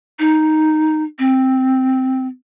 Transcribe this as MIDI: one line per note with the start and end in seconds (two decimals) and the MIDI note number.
0.19 1.03 63
1.19 2.27 60